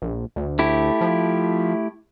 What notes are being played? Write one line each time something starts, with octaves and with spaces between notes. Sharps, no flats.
A#1
D2
A3 E4 G4
F3